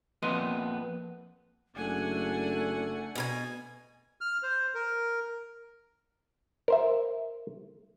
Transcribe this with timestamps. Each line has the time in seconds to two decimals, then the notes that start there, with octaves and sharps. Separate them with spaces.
0.22 F2 A#2 B3 D#5 C6
1.77 F#1 A3 D4 F#5 G#5
3.15 B2 A#4 G#5
4.21 F6
4.43 C5
4.74 A#4
6.68 A#4 C5 E5